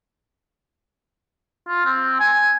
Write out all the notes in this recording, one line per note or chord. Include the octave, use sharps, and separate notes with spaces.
F4
C4
G#5